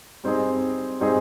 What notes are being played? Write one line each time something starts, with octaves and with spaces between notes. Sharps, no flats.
G3 C4 D#4 G#4
G3 C4 D#4 G#4